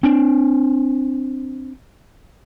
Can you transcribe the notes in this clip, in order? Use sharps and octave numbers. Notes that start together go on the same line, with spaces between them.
C4 D4